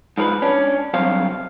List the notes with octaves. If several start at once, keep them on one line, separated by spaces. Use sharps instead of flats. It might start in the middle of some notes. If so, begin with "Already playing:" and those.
G#2 F3 A#4 B4
C#4 D4
G2 C3 F#3 C5 F5